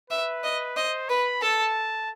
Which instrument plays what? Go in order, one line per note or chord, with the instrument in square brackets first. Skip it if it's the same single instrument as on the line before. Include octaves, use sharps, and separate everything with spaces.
[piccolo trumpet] B4 [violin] E5
[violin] D#5
[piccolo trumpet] C5 [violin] D#5
[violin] B4 [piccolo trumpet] B5
[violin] A4 [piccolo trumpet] A5